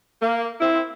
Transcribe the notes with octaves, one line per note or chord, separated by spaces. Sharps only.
A#3
C4 E4